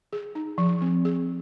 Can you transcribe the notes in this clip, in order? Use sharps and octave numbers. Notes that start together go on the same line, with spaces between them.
G#4
D#4
F3
C4
G#4